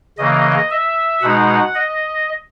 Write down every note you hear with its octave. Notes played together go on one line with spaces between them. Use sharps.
C#3 E3 A#3 D#5
E5
B2 G#3 D#4 F#5
D#5